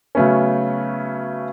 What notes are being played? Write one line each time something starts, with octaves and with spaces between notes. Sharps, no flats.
C#3 F#3 A3 B3 C#4